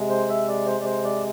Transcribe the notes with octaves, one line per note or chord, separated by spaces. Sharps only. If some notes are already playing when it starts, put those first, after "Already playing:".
Already playing: C3 G#3
C5
E5
D5
C5
D5
C5
D5